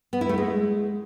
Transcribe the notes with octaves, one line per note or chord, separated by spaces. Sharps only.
B3
E4
A3
G#3